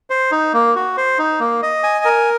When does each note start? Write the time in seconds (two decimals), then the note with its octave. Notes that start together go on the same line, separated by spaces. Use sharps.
0.10 C5
0.32 D#4
0.53 A#3
0.75 F#4
0.97 C5
1.19 D#4
1.40 A#3
1.62 D#5
1.83 G#5
2.05 A#4